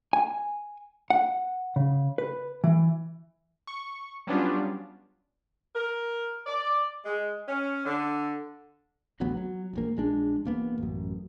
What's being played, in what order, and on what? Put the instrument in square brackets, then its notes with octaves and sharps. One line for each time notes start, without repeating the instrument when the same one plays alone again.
[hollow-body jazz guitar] G#5
F#5
C#3
B4
E3
[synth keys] C#6
F#3 G3 B3 C#4 D4 F4
[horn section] A#4
D5
G#3
C#4
D3
[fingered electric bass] A1 D2 F#3 B3
F#3
E1 A#1 A#3
A#1 G#3 D4
E1 A#3 B3
A1 F#2